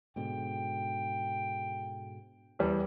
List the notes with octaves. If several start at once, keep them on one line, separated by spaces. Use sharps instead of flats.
G#2 B2 D3 G5
E2 G3